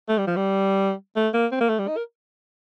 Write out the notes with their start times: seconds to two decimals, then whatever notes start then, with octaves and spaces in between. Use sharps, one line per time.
0.09 A3
0.18 G3
0.27 F3
0.36 G3
1.16 A3
1.34 A#3
1.52 C4
1.61 A#3
1.69 A3
1.79 G3
1.88 D#4
1.97 A#4